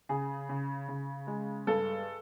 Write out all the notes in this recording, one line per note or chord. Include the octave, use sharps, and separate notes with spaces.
C#3 G#4
C#3
C#3
G#3
G2 A4